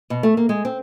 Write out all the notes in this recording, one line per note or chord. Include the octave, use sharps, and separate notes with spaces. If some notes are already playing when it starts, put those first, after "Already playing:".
B2
A3
A#3
G#3
C4